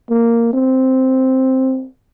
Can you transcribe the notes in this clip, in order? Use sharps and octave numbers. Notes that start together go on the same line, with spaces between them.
A#3
C4